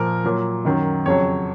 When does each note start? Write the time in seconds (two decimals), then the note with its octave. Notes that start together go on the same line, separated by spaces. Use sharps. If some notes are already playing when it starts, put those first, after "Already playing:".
Already playing: A#2 F3 A#4
0.24 A#2 F#3
0.65 F#2 D#3 F#3
1.06 F2 C#3 F#3 C#5